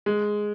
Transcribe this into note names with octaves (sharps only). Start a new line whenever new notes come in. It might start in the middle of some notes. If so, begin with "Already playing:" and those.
G#3